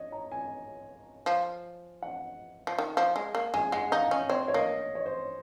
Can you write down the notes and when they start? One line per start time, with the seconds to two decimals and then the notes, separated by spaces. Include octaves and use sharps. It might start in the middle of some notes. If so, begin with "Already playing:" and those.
Already playing: C#5 D#5
0.12 A#5
0.32 G#5
1.26 F3
2.02 F#5
2.67 F3
2.78 D#3
2.97 F3
3.16 G#3
3.35 A#3
3.54 G#3 G#5
3.72 G#3 F#5
3.92 D#4 F5
4.11 C#4 D#5
4.30 C4 C#5
4.48 C#5
4.54 A#3 D#5
4.95 C#5
5.06 C5